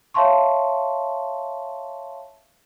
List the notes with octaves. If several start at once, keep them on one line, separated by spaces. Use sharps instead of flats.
C#5 E5 F5 A5 C6 C#6